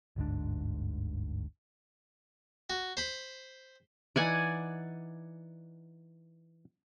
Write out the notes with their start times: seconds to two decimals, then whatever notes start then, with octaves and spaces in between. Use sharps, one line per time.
0.16 G1 D2 G#2 D4
2.70 F#4
2.97 C5 B5
4.16 E3 D#4 D5 F#5 G#5